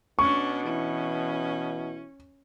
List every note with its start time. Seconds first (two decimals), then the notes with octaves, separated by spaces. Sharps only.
0.19 B2 C#4 D4 C#6
0.66 E3 C#4 E4